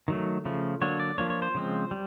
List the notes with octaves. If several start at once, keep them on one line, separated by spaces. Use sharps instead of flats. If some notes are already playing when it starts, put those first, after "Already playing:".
D#3 F#3 A3
C#3 F3 A3
D3 F#3 A#3 D4 C#5
D5
F3 A#3 D4 C#5
C#5
C5
C#3 F3 G#3 C4
G3